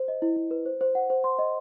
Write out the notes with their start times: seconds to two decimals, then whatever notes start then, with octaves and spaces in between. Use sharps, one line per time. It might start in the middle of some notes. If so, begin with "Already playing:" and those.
Already playing: C5
0.08 D#5
0.22 E4
0.36 E4
0.51 B4
0.66 C5
0.81 C5
0.95 F#5
1.10 C5
1.24 C6
1.39 D#5